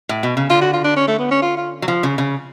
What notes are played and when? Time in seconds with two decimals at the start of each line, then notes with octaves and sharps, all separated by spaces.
0.09 A2
0.23 B2
0.37 C#3
0.50 D3 F4
0.61 F#4
0.73 F4
0.84 D4
0.96 C#4
1.08 A3
1.19 B3
1.31 C#4
1.42 F4
1.57 F4
1.82 F#3
1.88 F3
2.03 C#3
2.18 C#3